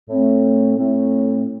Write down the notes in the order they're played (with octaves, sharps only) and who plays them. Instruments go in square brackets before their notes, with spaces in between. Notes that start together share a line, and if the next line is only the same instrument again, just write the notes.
[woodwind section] A2 A3 C4
A2 A3 C4